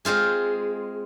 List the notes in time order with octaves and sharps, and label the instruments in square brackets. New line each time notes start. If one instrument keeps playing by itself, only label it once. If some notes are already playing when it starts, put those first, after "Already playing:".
[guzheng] G#3 C4 F4 G#4